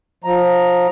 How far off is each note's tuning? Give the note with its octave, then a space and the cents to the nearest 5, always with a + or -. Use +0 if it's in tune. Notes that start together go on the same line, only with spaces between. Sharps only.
F3 +25 A#5 +0